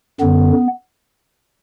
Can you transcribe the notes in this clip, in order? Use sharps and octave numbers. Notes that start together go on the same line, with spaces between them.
F#2 D3 B3